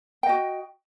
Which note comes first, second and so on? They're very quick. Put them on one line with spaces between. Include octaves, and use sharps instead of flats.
G5 D#5 F#4